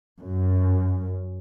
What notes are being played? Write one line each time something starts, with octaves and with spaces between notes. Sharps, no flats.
F#2